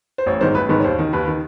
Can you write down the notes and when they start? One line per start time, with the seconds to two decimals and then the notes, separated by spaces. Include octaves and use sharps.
0.18 C5
0.26 A1 C#5
0.41 G#2 D#3 C5
0.55 A1 B4
0.69 G#2 D#3 B4
0.80 C#5
0.84 D#2 C5
0.99 D#3
1.13 D#2 B4
1.27 D#3